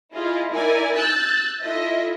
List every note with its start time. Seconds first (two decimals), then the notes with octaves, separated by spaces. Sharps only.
0.13 E4 F4 G#4 D#5
0.51 D#4 E4 A#4 D5 G#5
0.97 E6 F#6 G6 A6
1.61 E4 F4 A4 D#5 E5